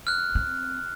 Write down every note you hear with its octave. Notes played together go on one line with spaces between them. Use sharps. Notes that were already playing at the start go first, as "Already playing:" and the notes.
F6 F#6
C4